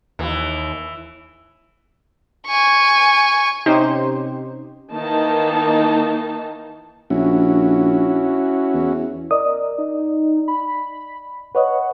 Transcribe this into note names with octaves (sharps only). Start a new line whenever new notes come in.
D#2 E3
G#5 C#6
C3 C#4 D#4 G4 C5
D#3 E3 A#3 D#4 A5
A#1 C#4 E4 F#4
E2
A#4 D5 D#5 D#6
D#4
B5
B4 C#5 D#5 F#5